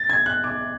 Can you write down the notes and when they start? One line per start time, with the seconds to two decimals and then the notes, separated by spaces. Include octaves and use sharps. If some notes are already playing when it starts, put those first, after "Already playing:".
Already playing: A6
0.10 G#6
0.26 F#6
0.44 D6